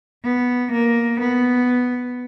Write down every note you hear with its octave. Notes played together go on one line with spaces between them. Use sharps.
B3
A#3
B3